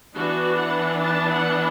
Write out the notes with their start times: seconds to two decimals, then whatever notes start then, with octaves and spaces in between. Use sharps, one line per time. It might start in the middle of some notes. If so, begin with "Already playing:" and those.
0.14 E3 B3 D4 F#4
0.58 F#5
1.02 A5
1.32 F#5